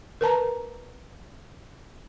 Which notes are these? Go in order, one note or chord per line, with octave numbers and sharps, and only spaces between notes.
A#4 B4 A5 A#5